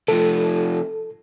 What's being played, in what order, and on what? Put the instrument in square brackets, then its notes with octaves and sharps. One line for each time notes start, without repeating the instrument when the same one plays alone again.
[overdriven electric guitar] C3 F3 [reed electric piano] A4